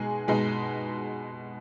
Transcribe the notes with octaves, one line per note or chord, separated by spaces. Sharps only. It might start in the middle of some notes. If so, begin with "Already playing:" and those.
Already playing: B2 G#3 D#4 G#4
B2 G#3 D#4